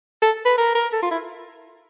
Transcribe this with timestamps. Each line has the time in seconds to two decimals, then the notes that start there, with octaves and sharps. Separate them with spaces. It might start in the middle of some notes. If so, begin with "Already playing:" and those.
0.22 A4
0.46 B4
0.58 A#4
0.75 A#4
0.93 A4
1.03 F4
1.11 E4